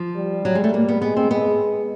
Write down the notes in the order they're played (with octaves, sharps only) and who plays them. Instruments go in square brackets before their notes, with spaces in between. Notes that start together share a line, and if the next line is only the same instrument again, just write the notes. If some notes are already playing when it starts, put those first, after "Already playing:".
Already playing: [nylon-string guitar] F3
[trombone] G3
[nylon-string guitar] F#3
G#3
A3
A#3
B3
[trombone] G#3 [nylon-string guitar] B3
[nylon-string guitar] C4
[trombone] G#3 [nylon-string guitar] B3